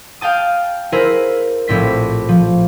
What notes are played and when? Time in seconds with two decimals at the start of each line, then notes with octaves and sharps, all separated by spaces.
0.21 F5 G5 A5 D#6
0.92 E4 G#4 A#4 C5 E5
1.68 A#1 A2 C4 B6
2.29 F3